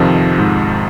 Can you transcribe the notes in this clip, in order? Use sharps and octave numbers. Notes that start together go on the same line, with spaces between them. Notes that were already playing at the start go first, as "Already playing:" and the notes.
Already playing: F2 C3 D#3 F3
G#2